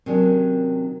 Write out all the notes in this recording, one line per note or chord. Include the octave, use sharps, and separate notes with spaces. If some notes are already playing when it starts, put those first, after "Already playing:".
C3 D#3 F#3 C#4 D4